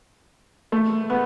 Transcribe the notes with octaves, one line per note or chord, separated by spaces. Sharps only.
A3
B3